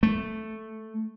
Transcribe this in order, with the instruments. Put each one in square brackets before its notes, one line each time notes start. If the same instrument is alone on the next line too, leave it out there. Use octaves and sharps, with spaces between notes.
[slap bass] A3